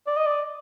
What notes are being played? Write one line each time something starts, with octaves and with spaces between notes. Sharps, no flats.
D5
D#5
D5